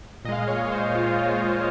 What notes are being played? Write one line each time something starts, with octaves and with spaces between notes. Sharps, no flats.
A#2 G#3 D#5 F5
D#5
C#5
C5
F4
F4